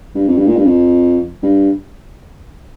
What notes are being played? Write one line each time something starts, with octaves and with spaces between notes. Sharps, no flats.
G2
F2
G2
A#2
G2
F2
G2